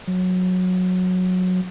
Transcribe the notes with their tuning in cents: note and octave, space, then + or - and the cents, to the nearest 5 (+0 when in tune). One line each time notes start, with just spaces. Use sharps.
F#3 -15